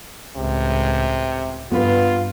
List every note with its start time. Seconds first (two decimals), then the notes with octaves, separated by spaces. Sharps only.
0.36 C#2 A2 C3
1.71 G2 B3 F4 B4